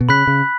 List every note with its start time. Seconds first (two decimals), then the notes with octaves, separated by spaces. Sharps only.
0.01 B2
0.09 C#3 B5 F#6 B6
0.27 C#3